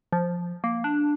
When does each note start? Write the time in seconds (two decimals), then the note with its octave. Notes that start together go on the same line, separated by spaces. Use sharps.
0.13 F3
0.64 A#3
0.84 D4